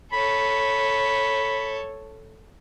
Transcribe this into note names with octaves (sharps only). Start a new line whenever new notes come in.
A4 C#5 B5